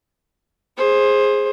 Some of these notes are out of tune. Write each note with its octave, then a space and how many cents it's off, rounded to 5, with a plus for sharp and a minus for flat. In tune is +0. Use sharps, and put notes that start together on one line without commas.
G#4 +0 C5 +20